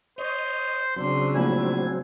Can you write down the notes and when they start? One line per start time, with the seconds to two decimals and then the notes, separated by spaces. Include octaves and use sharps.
0.18 C5 C#5 D#5
0.96 C#3 F#3 C4 D4 C6
1.35 A#1 A2 G#5 B5